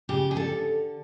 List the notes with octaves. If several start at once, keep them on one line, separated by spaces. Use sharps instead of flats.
C#3 G4
G#4
D3 A4